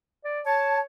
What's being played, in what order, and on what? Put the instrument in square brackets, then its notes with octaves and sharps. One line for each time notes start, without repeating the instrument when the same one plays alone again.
[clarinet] D5
[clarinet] C#5 [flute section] A5